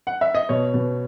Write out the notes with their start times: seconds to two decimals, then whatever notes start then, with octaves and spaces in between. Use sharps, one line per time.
0.07 F#5
0.21 E5
0.35 D#5
0.49 B2 C#5
0.74 B2